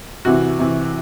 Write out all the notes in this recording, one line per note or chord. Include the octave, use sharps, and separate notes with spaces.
C3 E3 F#4
C3 E3